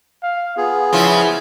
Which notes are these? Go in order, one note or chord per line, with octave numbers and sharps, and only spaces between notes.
F5
B3 F4 G#4
C#3 F3 E4 F4